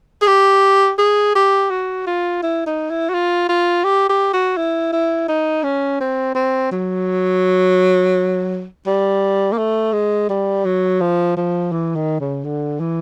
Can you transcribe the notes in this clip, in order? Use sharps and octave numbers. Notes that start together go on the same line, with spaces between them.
G#4
G4
G#4
G4
F#4
F4
E4
D#4
E4
F#4
F4
F4
G4
G4
F#4
E4
E4
D#4
C#4
C4
C4
F#3
G3
A#3
A3
G#3
G3
F#3
F3
F3
E3
D#3
C#3
D3
E3